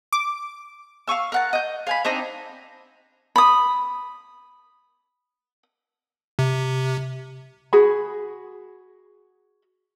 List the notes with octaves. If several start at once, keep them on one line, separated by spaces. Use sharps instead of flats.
D6
F5 G#5 C#6 E6
A#4 F#5 A5
D#5 G6
F5 G#5 B5
C4 D4 D#4 A#5
B5 D#6
C3
F#4 G#4 B5